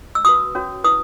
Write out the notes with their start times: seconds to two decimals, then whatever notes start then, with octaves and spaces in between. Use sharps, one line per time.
0.15 E6
0.25 F#4 B4 D#6
0.55 C#4 F#4 C#5
0.84 E4 B4 D#6